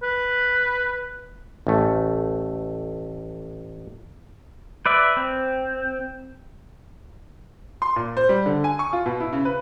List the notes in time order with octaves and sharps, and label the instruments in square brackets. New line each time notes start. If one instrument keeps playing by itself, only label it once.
[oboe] B4
[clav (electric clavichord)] A1 A3
[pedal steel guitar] B4 D5 E5
C4
[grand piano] C6
A#2
C5
G3
D3
G#5
C#6
F4
B2
E4
C#3
B4